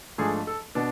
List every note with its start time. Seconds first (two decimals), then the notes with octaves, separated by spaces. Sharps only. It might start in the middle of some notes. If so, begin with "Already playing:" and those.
0.18 G#2 F3 A3 D4 G#4
0.47 A4
0.75 B2 B3 D4